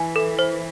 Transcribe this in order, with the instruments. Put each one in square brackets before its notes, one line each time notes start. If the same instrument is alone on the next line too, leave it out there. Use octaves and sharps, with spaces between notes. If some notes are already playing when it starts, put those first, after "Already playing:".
Already playing: [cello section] E3 [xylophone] G#5
[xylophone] A4
C5